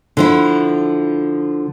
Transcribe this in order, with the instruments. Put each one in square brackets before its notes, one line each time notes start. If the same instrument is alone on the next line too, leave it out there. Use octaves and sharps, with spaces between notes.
[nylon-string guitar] D3 F3 E4